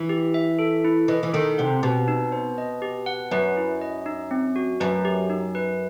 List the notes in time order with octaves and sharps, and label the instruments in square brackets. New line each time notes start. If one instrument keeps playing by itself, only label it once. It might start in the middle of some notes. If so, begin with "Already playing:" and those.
Already playing: [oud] E3
[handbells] G4
E5
A4
E4
[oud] E3 [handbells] D#5
[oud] E3
[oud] D#3 [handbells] A4
[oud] C3 [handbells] F#5
[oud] B2 [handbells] G4
[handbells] D#4
C5
D#5
G4
F#5
[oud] F#2 [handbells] B4
[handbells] E4
D#5
D#4
C4
F#4
[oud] F#2 [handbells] B4
[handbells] G4
D#4
B4